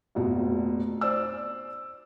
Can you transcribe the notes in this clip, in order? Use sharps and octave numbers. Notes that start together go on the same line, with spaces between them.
F1 A#1 B2
C5 D5 E6